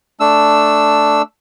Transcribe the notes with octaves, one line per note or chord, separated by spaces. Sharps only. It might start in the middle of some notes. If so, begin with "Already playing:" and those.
A3 D4 E6